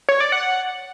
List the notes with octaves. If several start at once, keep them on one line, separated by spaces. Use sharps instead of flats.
C#5
D5
F#5